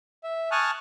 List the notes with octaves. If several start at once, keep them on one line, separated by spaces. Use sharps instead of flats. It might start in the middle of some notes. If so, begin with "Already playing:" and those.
E5
G#5 A5 C#6 D#6 F6 F#6